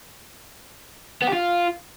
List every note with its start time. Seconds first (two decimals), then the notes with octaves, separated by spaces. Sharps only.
1.22 B3
1.27 G4
1.33 F4